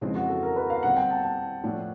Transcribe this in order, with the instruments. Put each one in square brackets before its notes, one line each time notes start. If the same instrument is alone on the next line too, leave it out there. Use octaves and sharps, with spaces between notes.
[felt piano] F2 C#3 E3 G#3 C4
[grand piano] F#4
A4
A#4
B4
F5
[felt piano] D3 G3 C4 [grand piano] F#5
[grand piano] G5
A5
A5
[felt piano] A2 F3 A3 D4